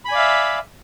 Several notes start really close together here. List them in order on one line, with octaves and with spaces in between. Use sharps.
B5 G#5 D5 F5 E5